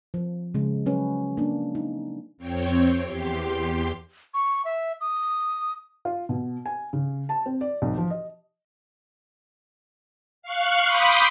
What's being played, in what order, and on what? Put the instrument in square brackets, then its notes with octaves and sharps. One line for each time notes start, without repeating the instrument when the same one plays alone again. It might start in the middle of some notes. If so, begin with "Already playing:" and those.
[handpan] F3
C#3 G#3
F#3 C#4 B4
A#3 D4
D#4
[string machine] F2 C4 C#5 G5
E2 G4 C6
[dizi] C#6
E5
D#6
[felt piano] F4
B2
G#5
C#3
A5
C4
D5
B1
F3
D#5
[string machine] F5 C#6 F#6
B5 C6 D6 D#6 G6 B6